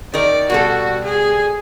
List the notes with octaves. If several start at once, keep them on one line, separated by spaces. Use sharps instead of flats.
D#3 A#4 D5
B2 G3 F#4 A4
G#4